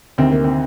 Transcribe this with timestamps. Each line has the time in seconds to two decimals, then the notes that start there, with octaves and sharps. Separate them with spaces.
0.18 D2 C3 D#3 C4
0.31 A#3
0.44 C4